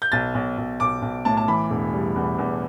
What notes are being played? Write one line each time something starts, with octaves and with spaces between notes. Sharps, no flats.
G6
B1 A6
B1
B1
B1 D6
B1
A2 A5
A5
E3 B5
E1
G3
E2
E2